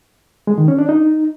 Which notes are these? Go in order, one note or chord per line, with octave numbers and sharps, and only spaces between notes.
G#3
D#3
C#4
D4
D#4